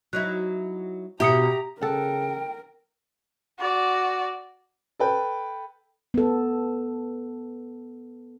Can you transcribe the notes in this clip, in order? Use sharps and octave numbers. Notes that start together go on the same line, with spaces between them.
F#3 D#4 E4 F#6
B2 E4 G4 E5 A#5 D#6 C#7
C#3 A4 A#4 F#5 G5
F#4 D5
A4 B4 G5
B3 A4